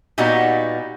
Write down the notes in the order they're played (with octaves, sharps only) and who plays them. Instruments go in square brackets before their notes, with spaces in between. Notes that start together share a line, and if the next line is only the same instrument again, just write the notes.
[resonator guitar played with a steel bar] A#2 G3 B3 D#4 F#4